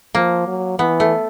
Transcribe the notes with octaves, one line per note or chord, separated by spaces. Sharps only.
F3 A#3
F#3
E3 B3
A3